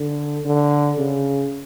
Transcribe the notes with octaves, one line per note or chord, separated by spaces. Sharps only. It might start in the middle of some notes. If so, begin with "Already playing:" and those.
Already playing: D3
D3
C#3